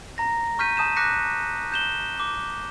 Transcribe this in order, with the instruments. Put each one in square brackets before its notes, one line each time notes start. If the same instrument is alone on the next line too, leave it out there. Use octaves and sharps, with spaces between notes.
[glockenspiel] A#5 A#6
C#6 F6 G6 B6 D#7
A5 D#6 G6 E7
D6 F#6 A#6 B6 C#7
G6 E7 G7
D6